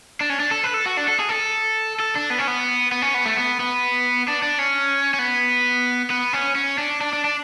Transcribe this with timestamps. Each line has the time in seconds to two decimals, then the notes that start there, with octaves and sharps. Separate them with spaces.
0.21 D4
0.29 C#4
0.40 D4
0.51 A4
0.64 B4
0.74 A4
0.86 F#4
0.97 D4
1.08 A4
1.19 G#4
1.29 A4
2.00 A4
2.15 D4
2.30 B3
2.38 C#4
2.47 B3
2.92 B3
3.02 C#4
3.15 B3
3.26 A3
3.37 B3
3.60 B3
4.28 D4
4.43 D4
4.59 C#4
5.14 C#4
5.19 B3
6.10 B3
6.33 C#4
6.55 C#4
6.78 D4
7.01 D4
7.13 D4
7.24 D4